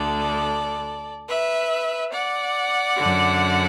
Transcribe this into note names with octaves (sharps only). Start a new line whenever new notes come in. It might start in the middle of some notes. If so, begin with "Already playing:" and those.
Already playing: D2 D3 A4 D5
B4 E5
D5 F#5
F#2 D3